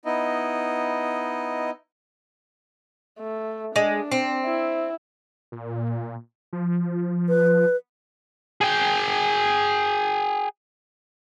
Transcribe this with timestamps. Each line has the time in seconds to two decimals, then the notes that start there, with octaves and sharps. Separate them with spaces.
0.05 B3 D#4 E4 D#5
3.19 A3
3.76 G#3 D4
4.11 C4
4.45 E4
5.52 A#2
6.53 F3
7.29 B4
8.61 G#4 G5